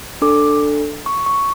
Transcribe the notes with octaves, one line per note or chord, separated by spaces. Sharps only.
D4 A4 D6
C#6
C#6